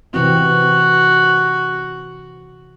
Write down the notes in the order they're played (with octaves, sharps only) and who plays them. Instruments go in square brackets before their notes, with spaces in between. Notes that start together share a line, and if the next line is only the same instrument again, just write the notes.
[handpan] C3 E3 C4 [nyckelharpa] F#4